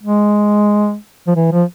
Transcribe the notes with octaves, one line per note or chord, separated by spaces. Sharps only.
G#3
F3
E3
F3